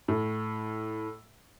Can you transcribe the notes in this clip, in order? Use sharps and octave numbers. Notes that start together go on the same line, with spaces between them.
A2